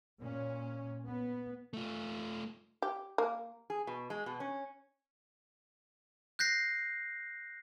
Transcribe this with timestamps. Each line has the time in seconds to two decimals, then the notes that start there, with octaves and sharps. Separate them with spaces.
0.19 A#2 C#4
1.07 B3
1.73 A3 F4
2.82 G4
3.18 A#3
3.70 G#4
3.87 B2
4.10 G#3
4.26 B2
4.40 C#4
6.39 F#6 G6 A#6 C7